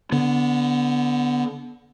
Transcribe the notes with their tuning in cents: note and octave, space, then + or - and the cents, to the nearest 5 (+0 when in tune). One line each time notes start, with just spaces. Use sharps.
D3 -20 B3 +0